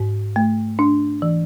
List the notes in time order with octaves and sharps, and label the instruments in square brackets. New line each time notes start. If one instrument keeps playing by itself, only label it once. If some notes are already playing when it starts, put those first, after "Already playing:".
Already playing: [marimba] G#2
A3
D4
E3